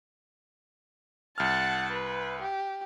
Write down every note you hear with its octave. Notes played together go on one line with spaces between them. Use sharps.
C2 F#5 A5 F6
B4
G4